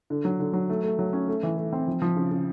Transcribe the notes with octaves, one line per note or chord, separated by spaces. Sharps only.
D3
F#3
D3
F#3
A3
A3
F#3
C#4
A3
E3
A3
C4
F3
F3
C#3
C#3